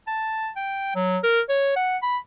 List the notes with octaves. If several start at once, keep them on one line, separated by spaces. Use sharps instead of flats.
A5
G5
F#3
A#4
C#5
F#5
B5